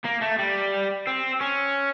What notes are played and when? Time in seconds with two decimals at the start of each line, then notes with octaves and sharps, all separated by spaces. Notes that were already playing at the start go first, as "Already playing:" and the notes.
0.05 A#3
0.22 A3
0.39 G3
1.07 C4
1.41 C#4